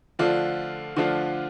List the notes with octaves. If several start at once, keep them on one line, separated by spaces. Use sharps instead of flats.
D3 F3 A3 D4 F4
D3 F3 A3 D4 F4